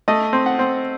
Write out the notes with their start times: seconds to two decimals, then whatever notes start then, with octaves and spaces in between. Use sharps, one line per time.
0.08 A3 D#5
0.33 C4
0.46 F#5
0.59 C4